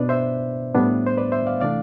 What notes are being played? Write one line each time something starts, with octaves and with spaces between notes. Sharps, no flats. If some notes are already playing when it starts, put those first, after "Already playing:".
Already playing: B2 B3 D4 B4 D5
C5 E5
A2 G3 B3 D4
C5
B4 D5
C5 E5
D5 F5
C3 E3 A3 D4 D5 F5